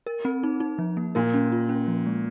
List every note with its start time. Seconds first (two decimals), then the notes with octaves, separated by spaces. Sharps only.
0.06 A#4
0.25 C4
0.43 D#4
0.60 D#4
0.78 F3
0.97 A#3
1.15 A#2 A#4
1.34 C#4
1.52 F4
1.69 C#4
1.87 F3
2.06 G#3